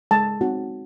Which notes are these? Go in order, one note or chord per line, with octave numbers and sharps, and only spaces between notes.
G#3 A5
C4 D#4 F#4